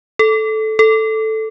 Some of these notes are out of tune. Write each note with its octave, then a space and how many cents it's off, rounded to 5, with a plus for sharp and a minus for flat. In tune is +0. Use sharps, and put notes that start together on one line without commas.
A4 -10
A4 +0